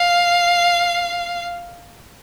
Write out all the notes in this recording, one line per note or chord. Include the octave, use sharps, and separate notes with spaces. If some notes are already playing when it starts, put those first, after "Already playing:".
Already playing: F5